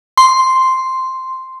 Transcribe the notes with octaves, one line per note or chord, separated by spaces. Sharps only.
C6